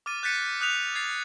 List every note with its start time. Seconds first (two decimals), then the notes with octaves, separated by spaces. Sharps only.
0.06 D6 F6 A6 D#7
0.23 F#6 G6 A6 B6 C#7 D#7
0.46 D#7
0.61 D#6 F#6 G6 B6 F7
0.95 G#6 A6 C7 F7